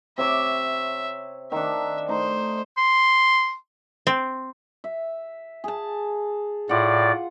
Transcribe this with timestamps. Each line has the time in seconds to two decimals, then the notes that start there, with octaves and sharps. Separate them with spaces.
0.18 C3 C#5 E5 D6
1.52 D#3 D4 E5
2.09 A3 D#4 C5
2.78 C6
4.07 C4
4.84 E5
5.64 G#4 A5
6.69 A2 F4 D5 F#5